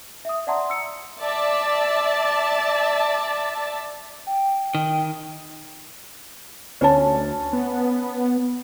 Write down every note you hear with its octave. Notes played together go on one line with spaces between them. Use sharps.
E5 D#6
D5 E5 F#5 A5 A#5 C6
E6 C#7
D5 E5 A5
G5
D#3
D2 C#4 C#5 A5
B3